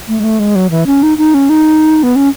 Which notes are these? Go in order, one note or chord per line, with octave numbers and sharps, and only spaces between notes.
A3
G#3
A3
G#3
F#3
E3
C#4
D#4
D#4
C#4
D#4
B3
C#4